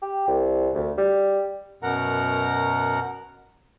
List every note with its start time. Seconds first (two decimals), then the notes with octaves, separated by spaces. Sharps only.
0.02 G4
0.27 C2
0.74 D2
0.98 G3
1.83 F#2 B2 A#4 F#5 A#5